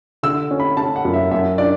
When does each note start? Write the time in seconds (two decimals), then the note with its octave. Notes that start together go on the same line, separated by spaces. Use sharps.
0.23 D3 E6
0.51 C#4
0.60 B5
0.77 C#4 A5
0.96 F#5
1.05 F#2
1.14 E5
1.31 F#2 E5
1.58 D4 D5